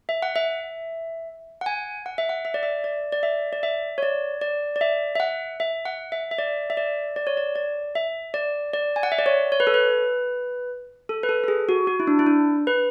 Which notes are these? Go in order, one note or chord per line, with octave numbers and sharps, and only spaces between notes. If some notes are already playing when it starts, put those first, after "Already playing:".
E5
F#5
E5
F#5
G#5
F#5
E5
F#5
E5
D5
E5
D5
D5
E5
D5
E5
C#5
D5
D5
D5
E5
E5
F#5
E5
F#5
E5
E5
D5
E5
D5
D5
C#5
D5
D5
E5
D5
D5
G#5
F#5
E5
D5
C#5
C#5
B4
A4
B4
A4
B4
A4
A4
G#4
F#4
F#4
E4
D4
E4
D4
B4